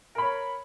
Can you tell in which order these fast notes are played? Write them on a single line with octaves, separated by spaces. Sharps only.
A#4 B5 C#5